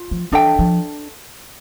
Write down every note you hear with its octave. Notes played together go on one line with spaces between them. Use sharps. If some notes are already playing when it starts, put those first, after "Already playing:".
Already playing: F4
F3
E3 D4 A4 E5 G5
F3